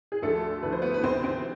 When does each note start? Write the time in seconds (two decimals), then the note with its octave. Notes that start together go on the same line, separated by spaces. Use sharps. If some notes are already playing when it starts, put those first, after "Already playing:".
0.12 G#4
0.22 D2 D3 F3 A3 A4
0.63 D2 D3 F3 B4
0.72 C5
0.82 B3 B4
0.94 B4
1.03 D2 C3 D#3 C4 C5
1.23 C4 C5